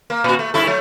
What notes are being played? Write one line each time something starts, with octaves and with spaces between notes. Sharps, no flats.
A#3
A#2 F#4
A3
G2 E4 A4
F#3 A3